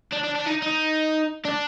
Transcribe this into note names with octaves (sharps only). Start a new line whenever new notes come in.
D4
D4
D4
D#4
D#4
D4